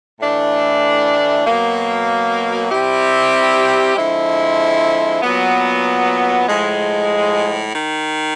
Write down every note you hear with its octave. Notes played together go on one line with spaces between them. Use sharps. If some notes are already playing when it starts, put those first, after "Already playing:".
A2 E3 A3 D4
B2 F#3 A#3
G3 C4 E4 G4
D3 F3 G#3 C4 E4
A#2 F#3 B3
A2 F3 G#3
D#3